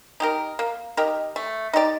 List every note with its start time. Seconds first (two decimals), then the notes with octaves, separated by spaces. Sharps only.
0.20 D#4 G4 A#4
0.59 A#3
0.97 D#4 G4 A#4
1.36 A3
1.73 D#4 G4 D5